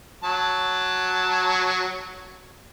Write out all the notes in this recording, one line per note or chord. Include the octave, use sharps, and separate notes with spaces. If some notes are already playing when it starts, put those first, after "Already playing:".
F#3 A5